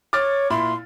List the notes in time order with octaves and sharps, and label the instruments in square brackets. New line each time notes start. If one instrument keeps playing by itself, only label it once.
[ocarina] C#5 [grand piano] D6 F6 A6
[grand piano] A#2 E4 B5 [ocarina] C6